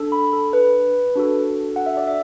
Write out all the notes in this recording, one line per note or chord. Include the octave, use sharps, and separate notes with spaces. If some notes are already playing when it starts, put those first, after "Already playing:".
Already playing: D4 A4
B5
A4
B4
D4 F#4 A4
F#5
E5
D5
E5